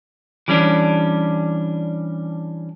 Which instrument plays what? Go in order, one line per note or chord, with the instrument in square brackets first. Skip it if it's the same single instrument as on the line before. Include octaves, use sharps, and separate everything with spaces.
[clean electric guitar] E3 G3 C#4 D4